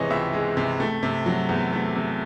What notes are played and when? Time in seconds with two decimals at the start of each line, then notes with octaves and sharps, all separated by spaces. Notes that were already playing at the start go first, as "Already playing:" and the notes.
Already playing: C3 E3 G#3 C5 C#5 D#5
0.10 C#2 E5
0.33 G#3
0.57 C3
0.80 A3
1.03 C3
1.26 F#3
1.49 E2
1.73 A3
1.96 C3